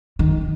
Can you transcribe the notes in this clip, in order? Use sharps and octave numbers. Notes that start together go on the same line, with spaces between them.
D#3